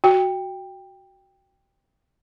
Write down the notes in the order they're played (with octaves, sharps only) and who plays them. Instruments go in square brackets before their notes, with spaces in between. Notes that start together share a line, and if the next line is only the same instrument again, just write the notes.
[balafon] F#4 [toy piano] G5